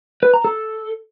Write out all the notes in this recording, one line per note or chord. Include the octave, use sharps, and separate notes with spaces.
B4
A#5
A4